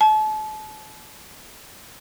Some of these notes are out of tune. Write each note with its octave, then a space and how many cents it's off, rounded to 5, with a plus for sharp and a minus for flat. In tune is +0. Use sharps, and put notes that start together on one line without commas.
A5 -35